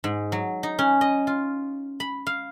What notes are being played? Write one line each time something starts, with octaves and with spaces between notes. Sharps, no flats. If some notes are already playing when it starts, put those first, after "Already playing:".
G#2
F#3
D#4
C#4
D#5
F4
B5
F5